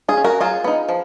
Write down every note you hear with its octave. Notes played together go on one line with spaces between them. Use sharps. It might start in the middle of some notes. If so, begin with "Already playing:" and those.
F4 G#4
C#4
F#4 A#4
F#3 F4 G#4
B3 D#4
F3